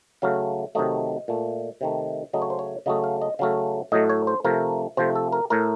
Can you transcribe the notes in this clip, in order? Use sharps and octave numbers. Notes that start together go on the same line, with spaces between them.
C#3 F#3 A3 F5
C3 D#3 F#3 A3 D#5
A#2 A3
C3 D#3 A3
C#3 F#3 A3 D#5
C#5
C5
C#5
C#3 F#3 A3 D#5
F5
D#5
C#3 F#3 A3 F5
A2 F#3 A3 D#5
C#5
C5
C3 F3 A3 A#4
C3 F3 A3 C5
A4
A#4
A2 A3 A#4